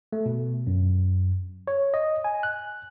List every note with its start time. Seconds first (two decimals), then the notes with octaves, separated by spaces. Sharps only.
0.13 A3
0.26 B2
0.67 F#2
1.67 C#5
1.94 D#5
2.24 G#5
2.43 F#6